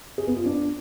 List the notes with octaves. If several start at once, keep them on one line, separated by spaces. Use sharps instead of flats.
G#4
B3
F4
D4